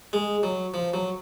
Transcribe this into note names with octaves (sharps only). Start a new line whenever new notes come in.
G#3
F#3
F3
F#3